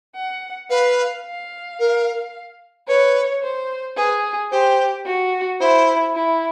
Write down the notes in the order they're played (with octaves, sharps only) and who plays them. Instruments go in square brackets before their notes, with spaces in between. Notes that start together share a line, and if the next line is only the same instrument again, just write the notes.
[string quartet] F#5
[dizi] B4 [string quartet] F5
[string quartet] F5
[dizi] A#4
[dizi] B4 [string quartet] C#5
[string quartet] C5
[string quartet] G#4 [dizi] B4
[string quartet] G4 [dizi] C5
[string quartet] F#4
[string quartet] E4 [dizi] C5
[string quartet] E4